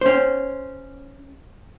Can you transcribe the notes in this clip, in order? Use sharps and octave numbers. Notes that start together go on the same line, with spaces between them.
C#4 C5